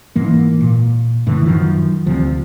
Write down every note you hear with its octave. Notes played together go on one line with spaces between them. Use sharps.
G#2 E3 A#3
A#2
F#2 A2 D3 E3
F#2 D#3 F3
D2 C3 F3